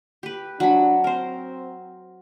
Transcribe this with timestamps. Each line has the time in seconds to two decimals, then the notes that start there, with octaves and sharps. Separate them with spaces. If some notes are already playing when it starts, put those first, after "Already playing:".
0.23 G4 B4
0.60 F#3 D4 B5
1.04 C4 A#4 C5